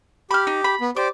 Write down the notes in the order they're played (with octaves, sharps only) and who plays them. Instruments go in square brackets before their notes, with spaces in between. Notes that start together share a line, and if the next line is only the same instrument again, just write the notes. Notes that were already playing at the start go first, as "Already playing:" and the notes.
[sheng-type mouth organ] G4 [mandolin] B5 F6
[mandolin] D#4
B5
[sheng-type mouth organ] B3
[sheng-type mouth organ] G4 C5 D5 [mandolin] D6